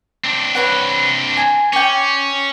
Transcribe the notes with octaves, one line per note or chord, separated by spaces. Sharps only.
C4 D4
B4 C#5 F#5
G#5
C#4 D5 G5